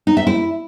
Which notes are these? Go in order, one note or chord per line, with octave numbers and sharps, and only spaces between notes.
D#4
E5
E4